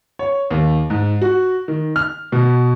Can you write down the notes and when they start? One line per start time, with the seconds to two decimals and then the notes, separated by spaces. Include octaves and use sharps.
0.19 C#5
0.51 D#2
0.90 G#2
1.21 F#4
1.68 D#3
1.96 F6
2.32 B2